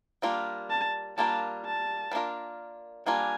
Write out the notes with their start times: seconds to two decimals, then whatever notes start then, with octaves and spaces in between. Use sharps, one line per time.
0.22 G3 A#3 D4 F4 A#4
0.70 A5
1.17 G3 A#3 D4 F4 A#4 A5
1.65 A5
2.12 G3 A#3 D4 F4 A#4
3.06 G3 A#3 D4 F4 A#4 G#5